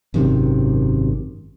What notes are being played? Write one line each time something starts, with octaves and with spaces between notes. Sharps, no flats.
G#1 F#2 C3 D#3